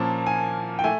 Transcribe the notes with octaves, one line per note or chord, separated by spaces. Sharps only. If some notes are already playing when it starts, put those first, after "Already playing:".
Already playing: A#2 F3 A#3 C#4 A5
G#5
G5
A3 G#5